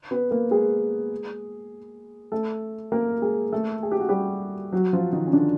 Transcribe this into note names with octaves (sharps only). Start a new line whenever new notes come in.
B3 B4
A#3 A#4
G#3 G#4
A3 A4
A#3 A#4
G#3 G#4
A3 A4
G#4
G4
F#4
G3 G4
F#3 F#4
F3 F4
D#3 D#4
C#4
D3 D4